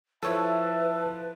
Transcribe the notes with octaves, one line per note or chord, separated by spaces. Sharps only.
F3 E4 A4 B4 C#5 E5 A5